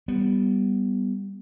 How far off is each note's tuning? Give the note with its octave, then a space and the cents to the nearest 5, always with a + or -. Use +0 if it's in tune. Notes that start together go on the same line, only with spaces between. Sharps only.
G3 +0 B3 +0